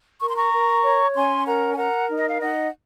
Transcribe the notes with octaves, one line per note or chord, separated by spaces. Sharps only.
A#4 C#6
C6
A#5 C#6
A#4
C#5
C#4 G#5 C6
A#4 F#5 A#5
G#5
A#4 F#5 A#5
D#4
D#5
F5
D#4 D#5 F#5